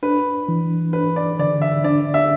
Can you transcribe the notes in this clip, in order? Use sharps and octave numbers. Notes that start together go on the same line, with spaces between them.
D4 B4
E3
D4 B4
D5
D3 D5
E5
D4 D5
E5